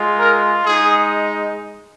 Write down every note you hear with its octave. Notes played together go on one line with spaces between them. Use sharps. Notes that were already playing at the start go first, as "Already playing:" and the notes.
Already playing: G#3 F4
A#4
G#3 D#4 G#4